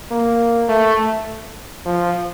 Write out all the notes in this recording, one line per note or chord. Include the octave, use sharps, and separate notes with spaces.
A#3
A3
F3